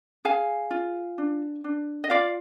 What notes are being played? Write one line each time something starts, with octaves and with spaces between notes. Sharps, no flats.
G#4 F5 G#5
F4
D4
D4
D#5
F4 D5 F5